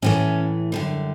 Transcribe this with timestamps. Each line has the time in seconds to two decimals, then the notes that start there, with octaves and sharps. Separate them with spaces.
0.02 A2 E3 A3 C#4
0.72 F#2 D3 G3